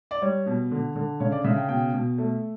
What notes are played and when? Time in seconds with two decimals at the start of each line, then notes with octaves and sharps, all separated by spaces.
0.11 D5
0.22 G3 C#5
0.46 B2
0.71 D3
0.96 D3
1.20 C#3 C#5
1.32 D5
1.44 C#3 E5
1.56 G5
1.69 B2 G5
1.94 B2
2.18 A3